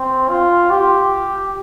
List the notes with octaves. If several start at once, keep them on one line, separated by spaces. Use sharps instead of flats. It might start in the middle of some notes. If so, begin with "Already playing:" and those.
Already playing: C4
F4
G4